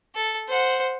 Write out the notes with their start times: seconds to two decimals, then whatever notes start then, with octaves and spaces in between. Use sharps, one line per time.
0.15 A4
0.48 C5 F#5